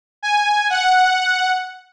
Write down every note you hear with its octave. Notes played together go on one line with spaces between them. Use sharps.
G#5
F#5